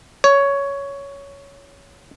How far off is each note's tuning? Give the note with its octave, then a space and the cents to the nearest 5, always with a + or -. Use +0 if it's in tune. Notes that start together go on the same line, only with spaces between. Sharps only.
C#5 +10